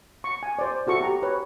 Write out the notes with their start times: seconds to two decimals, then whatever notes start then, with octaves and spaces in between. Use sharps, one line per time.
0.24 C#6
0.43 G#5
0.59 C5 D5
0.87 E4 F#4 A4 C#6
1.01 G4 A#5
1.23 B4 C#5